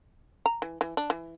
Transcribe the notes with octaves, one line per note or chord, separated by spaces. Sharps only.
A#5
E3
E3
D4
E3